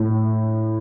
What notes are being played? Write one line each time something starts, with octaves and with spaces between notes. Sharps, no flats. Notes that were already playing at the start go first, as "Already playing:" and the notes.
Already playing: A2